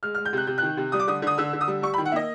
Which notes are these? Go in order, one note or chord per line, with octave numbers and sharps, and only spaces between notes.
G#3 F6
F6
G#3
G6
C3 F#6
C3 G6
D#3 F#6
C3
G3 D#6
D6
D3 D#6
D3 D#6
D3 E6
D3
D#6
G3
G3 C#6
B5
D#3
F#5
A#3 D#5 E5